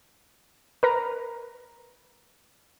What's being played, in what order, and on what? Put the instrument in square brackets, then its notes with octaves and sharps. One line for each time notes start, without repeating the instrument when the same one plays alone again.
[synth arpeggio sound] A#4 B4 A#5